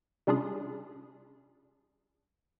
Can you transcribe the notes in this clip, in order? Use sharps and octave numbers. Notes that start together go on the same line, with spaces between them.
C3 G3 C#4 D4 F4 G#4